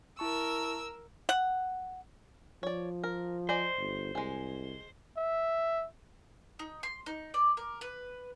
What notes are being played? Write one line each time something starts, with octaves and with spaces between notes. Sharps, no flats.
E4 A#4 A5 C#6 E6
F#5
F3 C#5 D5
A#4
C5 D5 D#5 G#5
G1
C2 G#3 G#4
E5
D#4
C6
D#4
D5
A#4
B4